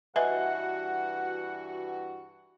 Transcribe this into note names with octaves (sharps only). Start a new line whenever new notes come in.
G2 E3 F#4 B4 D#5 E5 F#5 G#5